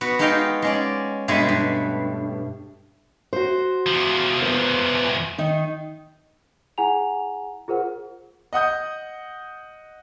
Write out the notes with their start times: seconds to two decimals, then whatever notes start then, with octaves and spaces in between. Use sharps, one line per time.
0.01 B3 F#4
0.19 G#3 D#4 F#4 A4 F5 G5
0.62 G#3 C#4 D5
1.28 G2 B2 G#3 A3 G#5 B5
1.49 G2
3.33 F#4 C5
3.86 E2 F3
4.42 B3 C5
5.38 D#3 D#4
6.78 E4 G#4 F#5 G#5 A#5 F7
7.68 F4 G#4 A#4 C5 F#5
8.53 D#5 F#5 D#6 G6